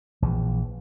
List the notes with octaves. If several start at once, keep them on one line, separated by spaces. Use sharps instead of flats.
A#1 E3